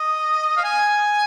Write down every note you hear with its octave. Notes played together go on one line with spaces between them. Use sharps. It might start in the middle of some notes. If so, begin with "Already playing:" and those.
Already playing: D#5
F5
G#5